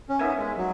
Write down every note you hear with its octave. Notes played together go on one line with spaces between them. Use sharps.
C#4
B3 D#4 A#4 E5 G#5
G#3
F#3